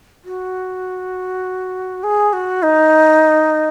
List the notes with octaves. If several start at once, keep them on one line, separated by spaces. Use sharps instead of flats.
F#4
G#4
F#4
D#4